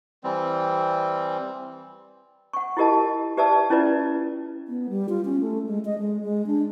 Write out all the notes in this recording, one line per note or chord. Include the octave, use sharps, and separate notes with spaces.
E3 G3 C4
F#5 C#6
E4 F4 G4 A#4 D#5 A5
G4 B4 D5 E5 A5 E6
C#4 E4 F4 B4 D5
B3
G3
F4
C#4
A3
G#3
D#5
G#3
G#3
D4